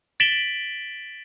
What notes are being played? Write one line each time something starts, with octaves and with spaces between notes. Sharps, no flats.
A6 B6 D7 E7 F#7 G7